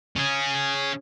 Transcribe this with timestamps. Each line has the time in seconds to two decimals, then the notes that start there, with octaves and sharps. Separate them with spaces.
0.16 C#4 G#4